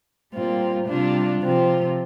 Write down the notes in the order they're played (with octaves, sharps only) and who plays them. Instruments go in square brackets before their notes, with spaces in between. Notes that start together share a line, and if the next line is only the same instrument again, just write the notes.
[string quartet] A#2 G3 C4 F4
C3 G3 D4 F4
C3 F3 C4 F4